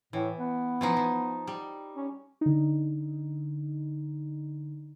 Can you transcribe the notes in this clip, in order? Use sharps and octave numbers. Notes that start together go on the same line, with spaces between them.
A2 E3
B3
E3 F3 D#4
F3
G3
C#4
D3 D#4